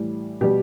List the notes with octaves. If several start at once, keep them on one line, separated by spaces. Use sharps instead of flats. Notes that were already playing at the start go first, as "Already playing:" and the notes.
Already playing: A2 E3 G3
B2 G3 G4